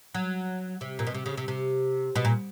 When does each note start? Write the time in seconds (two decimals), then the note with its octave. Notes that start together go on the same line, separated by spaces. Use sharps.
0.14 F#3
0.81 C3
0.99 A#2
1.07 B2
1.14 C3
1.26 C#3
1.37 C3
1.48 C3
2.15 B2
2.25 A#2